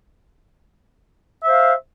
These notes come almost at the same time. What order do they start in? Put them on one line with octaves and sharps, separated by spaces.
E5 C5 F5